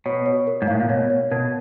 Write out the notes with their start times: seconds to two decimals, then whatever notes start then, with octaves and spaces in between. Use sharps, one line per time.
0.06 B2 C#5
0.26 C#5
0.47 A#4
0.62 G#2
0.68 A2 F5
0.80 A#2
0.89 B2 C#5
1.10 C#5
1.31 B2 A#4